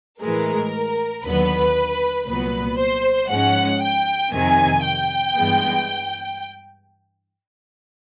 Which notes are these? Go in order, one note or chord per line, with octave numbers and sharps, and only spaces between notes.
A2 E3 G#3 A#4
D#2 D3 F#3 B3 B4
C2 A#2 F#3 B3 B4
C5
G#2 F3 G#3 C#4 F#5
G5
F2 C3 D#3 G#5
G5
G2 E3 G#3 B3